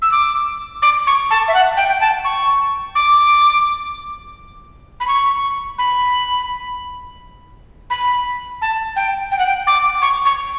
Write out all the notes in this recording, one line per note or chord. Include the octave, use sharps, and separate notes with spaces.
E6
D6
D6
C#6
A5
E5
F#5
G5
G5
A5
C#6
D6
B5
C#6
B5
B5
A5
G5
G5
F#5
G5
D6
C#6
C#6